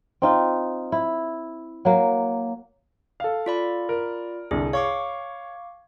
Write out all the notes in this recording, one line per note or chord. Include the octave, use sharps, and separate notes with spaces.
C4 D#4 F4
E4
F#3 A#3
A4 F5
F4 D5 B5
A#4
C2 D3 G#4
C#5 F5 C#6 D6